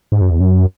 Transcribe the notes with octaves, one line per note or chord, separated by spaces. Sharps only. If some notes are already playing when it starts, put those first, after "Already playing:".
G#2
F#2
E2
F#2